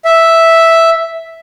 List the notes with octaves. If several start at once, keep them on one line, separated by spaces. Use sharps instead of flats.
E5